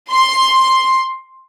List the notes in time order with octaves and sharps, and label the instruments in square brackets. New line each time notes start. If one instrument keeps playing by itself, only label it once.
[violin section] C6